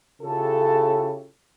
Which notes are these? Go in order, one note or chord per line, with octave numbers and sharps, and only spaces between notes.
C#3 E4 F4 G4 A4